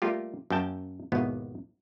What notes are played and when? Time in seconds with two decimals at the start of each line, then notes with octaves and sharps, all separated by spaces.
0.02 G3 A3 A#3 F4 G4
0.50 F#2 A#3 C#4 G5 A5
1.12 G#1 D#2 B2 B3 E4